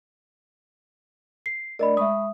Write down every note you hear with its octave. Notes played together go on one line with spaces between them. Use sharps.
C7
A3 D4 A#4 D5 D#5 B5
G#3 E5 B5 C#6 D#6